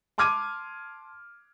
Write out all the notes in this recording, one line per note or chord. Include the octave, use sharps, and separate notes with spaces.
A5 C6 D6 F6 G#6 D#7